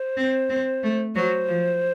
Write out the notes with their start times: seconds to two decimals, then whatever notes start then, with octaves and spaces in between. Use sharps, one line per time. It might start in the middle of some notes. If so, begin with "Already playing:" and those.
Already playing: C5
0.17 C4
0.49 C4
0.83 A3
1.16 F#3 C5
1.48 F3